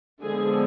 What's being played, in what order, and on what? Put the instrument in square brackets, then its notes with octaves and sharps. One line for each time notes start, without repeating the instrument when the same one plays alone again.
[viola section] D3 F3 G#3 B3 G#4